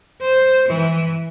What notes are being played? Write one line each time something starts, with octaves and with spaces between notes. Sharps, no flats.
C5
E3